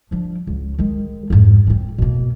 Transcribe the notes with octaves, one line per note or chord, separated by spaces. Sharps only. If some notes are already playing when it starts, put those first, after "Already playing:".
F3 D4
C#2
D#3 G#3
F2 G#2
C4 C#4
B2 A#3